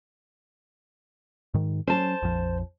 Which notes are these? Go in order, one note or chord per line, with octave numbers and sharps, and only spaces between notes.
G#2 D#3
F#3 G#3 C#4 C5 A5
A#1 F2 F3